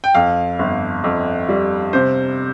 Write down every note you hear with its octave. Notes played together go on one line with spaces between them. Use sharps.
G5
F2 F5
G1
F2
G3
C3 C5